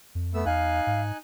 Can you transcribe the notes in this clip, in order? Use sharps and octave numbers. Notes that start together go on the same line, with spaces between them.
F2
A3 B3 E6
E2 D#4 F5 G#5 F#6
G#2